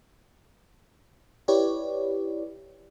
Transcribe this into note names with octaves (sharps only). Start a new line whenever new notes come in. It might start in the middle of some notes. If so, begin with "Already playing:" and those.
E4 G4 B4 C#5 D5